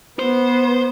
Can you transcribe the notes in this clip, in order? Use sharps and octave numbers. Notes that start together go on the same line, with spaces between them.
B3 C5